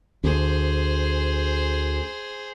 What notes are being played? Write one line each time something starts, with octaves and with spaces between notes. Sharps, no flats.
D2 G#4 C5